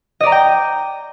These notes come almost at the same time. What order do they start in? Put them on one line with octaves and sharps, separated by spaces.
D#5 D5 A#5 D6 G5